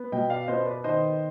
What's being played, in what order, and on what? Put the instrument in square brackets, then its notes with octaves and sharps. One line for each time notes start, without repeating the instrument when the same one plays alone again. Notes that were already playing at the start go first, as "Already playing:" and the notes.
Already playing: [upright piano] B3
B2 D#5 G5
D5 F5
B3 C5 D#5
B4 D5
D#3 C5 D#5